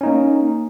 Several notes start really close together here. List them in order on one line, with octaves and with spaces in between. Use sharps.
C#4 D#4 A#3